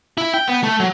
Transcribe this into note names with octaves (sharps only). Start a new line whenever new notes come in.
E4
G5
B3
A3
F#3